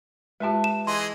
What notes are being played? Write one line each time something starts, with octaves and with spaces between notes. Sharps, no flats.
G#3 F4 G4 B4 E5 A5
E7
E3 G#4 D#5 C6